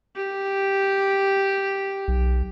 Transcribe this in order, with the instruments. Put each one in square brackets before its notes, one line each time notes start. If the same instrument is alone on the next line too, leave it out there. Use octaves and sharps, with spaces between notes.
[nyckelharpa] G4
[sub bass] B1